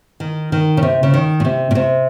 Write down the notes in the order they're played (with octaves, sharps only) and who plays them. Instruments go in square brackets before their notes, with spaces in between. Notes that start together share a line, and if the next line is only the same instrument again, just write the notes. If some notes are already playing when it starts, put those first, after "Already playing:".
[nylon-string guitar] D#3
D#3
C#3
C3
C#3
D#3
A#2
C3
A#2
C3